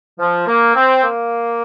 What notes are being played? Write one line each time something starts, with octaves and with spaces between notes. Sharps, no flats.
F3
A#3
C4
A#3